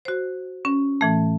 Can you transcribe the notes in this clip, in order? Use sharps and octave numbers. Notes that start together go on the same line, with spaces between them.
F#4 C5
C#4
A2 E3 A3